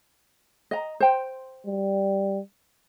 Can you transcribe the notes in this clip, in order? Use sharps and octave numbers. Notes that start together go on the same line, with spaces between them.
D#5 A#5
C5 G5
G3